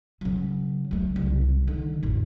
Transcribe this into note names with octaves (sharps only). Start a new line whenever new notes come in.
C#3 F#3
F#3 A3
C2 C#3
D3 D#3
A1 F2